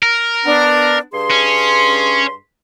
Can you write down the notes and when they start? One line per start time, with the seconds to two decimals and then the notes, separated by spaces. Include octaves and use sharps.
0.03 A#4
0.44 B3 D4
1.13 G2 G#4 C6
1.30 C#4